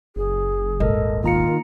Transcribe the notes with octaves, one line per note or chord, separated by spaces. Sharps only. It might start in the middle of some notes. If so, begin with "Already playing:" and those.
F#1 G#4
D#1 G#1 A4 A#4 D#5
D#3 A#3 F4 A#5 C#7